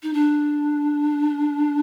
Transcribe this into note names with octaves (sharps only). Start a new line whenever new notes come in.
D#4
D4